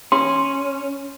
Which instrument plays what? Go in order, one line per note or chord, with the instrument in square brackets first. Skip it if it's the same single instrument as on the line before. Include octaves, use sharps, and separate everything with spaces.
[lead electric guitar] C#4 [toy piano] C6